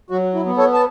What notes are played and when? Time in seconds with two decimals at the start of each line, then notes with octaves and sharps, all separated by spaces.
0.10 F#3 F#4
0.34 E4
0.45 B3
0.57 A4 C#5
0.73 A5